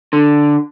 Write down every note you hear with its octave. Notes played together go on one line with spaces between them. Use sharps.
D3